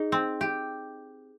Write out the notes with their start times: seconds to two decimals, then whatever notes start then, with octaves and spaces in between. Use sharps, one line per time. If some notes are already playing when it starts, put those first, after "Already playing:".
Already playing: D#4 G#4
0.12 C4
0.41 G4